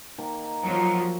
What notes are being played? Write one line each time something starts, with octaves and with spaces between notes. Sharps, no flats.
D#3 A#3 A5
F3 F#3 A#5